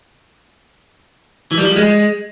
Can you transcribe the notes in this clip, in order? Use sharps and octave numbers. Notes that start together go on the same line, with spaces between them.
E3
G3
F3
G3
G#3